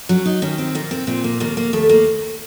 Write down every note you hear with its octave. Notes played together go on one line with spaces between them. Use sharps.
F#3 C#4
D#4
D#3 C#4
C4
A#2 A#3
C4
A#2 C4
A#3
D#2 A#3
A#3
D#2 A3
A#3